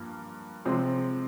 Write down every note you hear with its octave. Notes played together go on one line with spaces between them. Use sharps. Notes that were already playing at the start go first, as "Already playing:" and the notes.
Already playing: G2 F3 A#3
C3 F3 G#3 C4